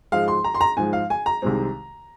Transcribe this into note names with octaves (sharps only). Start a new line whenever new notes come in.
G#2 F3 G#3 F5
C6
A#5
C6
A#5
G#2 F3 G#3 G#5
F5
G#5
A#5
C2 C3 D#3 G#3 C4